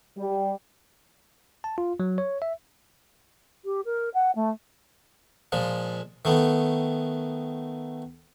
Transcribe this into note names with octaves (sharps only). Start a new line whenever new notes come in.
G3
A5
F4
F#3
C#5
E5
G4
A#4
F#5
A3
A#2 F3 G#3
D#3 A3 B3